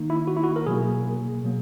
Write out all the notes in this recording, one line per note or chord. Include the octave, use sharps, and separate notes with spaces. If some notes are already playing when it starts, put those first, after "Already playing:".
Already playing: D#3 A#3 D#4
E4
F#4
E4
F#4
A#4
B2 F#3 A#3 G#4
B2 F#3 A#3